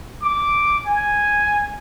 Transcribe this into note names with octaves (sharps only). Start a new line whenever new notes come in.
D6
G#5